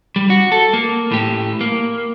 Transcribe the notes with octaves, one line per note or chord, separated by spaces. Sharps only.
G3
F#4
A4
A#3
A2 G4
A#3